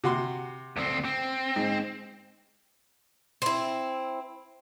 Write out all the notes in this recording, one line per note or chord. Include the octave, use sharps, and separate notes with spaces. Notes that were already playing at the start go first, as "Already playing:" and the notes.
C3 F#4 C6
D2 C4
C4
G#2
C4 E4